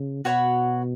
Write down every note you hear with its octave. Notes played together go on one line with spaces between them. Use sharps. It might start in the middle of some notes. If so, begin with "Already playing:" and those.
Already playing: C#3
B2 F#4 C#5 F#5 B5